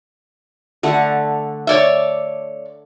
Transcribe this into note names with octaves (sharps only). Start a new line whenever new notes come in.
D3 A3 F#5
C#5 D5 E5